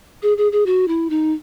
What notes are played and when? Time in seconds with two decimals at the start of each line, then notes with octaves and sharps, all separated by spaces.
0.22 G#4
0.38 G#4
0.52 G#4
0.66 F#4
0.88 E4
1.10 D#4